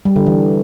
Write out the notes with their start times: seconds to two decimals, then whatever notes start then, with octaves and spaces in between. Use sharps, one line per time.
0.05 G3
0.16 D3
0.27 E3